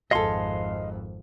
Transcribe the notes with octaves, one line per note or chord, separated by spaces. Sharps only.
G#1 F2 G#4 A4 D#5 F5 C6